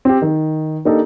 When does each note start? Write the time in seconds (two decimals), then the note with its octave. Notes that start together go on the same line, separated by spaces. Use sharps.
0.05 C4 G4
0.22 D#3
0.85 A#3 D4 D#4 G4 A4